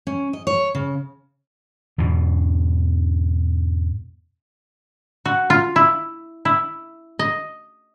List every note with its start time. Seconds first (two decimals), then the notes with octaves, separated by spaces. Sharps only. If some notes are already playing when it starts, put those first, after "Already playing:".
0.07 C#4
0.33 D#5
0.47 C#5
0.75 C#3
1.98 E2 G#2 B2
5.25 F#4
5.50 F4
5.76 E4
6.45 E4
7.19 D#5